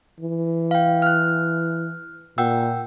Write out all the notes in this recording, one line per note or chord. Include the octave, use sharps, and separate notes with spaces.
E3
F5 G5
F6 F#6
A#2 F#5 G5 E6